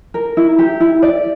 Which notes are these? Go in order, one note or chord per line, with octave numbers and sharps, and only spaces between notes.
A#4
E4
G4
E4
D5